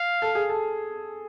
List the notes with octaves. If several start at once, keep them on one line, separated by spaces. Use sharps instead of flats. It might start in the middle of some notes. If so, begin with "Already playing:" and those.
Already playing: F5
A4
G#4
A4